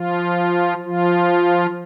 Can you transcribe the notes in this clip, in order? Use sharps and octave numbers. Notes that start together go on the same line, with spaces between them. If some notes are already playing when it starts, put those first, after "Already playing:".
Already playing: F3 F4
F3 F4